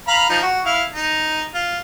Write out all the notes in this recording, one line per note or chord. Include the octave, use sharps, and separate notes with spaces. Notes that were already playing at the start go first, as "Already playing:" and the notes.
F5 A#5 B5
F3 D#4
F#4
E4 F5
D#4
F4